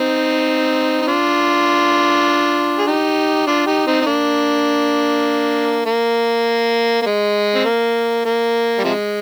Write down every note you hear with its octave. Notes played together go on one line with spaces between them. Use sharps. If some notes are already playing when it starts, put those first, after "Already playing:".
Already playing: C4 D#4
D#4
D4 F4
G#4
D#4 G4
D4 F4
D#4 G4
C4 D#4
D#4
A#3 D4
A#3
A#3
G#3
C4
A#3
A#3
G3
C3 F3 G#3